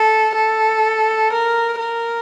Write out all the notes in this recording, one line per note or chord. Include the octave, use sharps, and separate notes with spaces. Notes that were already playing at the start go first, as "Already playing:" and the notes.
Already playing: A4
A4
A#4
A#4